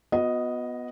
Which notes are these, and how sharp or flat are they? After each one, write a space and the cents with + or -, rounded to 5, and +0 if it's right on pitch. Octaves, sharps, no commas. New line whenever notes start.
B3 +0 F#4 -40 D#5 +0